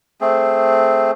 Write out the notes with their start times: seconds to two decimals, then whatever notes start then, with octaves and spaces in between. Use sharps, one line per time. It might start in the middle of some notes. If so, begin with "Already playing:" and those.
0.21 A3 C4 G#4